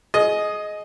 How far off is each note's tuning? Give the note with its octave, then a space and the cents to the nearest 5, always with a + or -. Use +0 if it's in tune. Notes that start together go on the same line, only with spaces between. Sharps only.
G#4 +25 D#5 +0